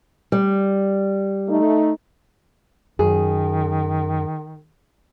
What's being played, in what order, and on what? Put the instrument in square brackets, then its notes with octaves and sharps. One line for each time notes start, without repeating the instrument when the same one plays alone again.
[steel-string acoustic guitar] G3
[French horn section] A3 D#4
[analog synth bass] F#2 [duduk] D#3 [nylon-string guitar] G#4